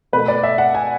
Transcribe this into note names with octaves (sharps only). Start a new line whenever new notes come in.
B2 A3 B4
D5
E5
F#5
G#5